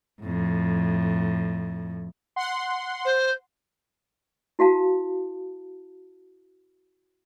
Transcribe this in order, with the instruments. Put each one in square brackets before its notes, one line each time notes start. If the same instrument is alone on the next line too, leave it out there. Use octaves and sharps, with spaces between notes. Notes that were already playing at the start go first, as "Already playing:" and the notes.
[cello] F2 A2
[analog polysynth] F#5 C6
[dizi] C5
[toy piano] E4 F#4 F5 A5